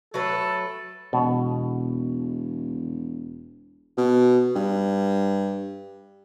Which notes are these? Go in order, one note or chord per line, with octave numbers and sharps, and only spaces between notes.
F#3 A3 A4 B4
E1 B2
B2
G2